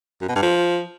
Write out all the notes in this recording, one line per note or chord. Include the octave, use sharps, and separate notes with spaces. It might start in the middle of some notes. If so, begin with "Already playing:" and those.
F#2
B2
G2
F3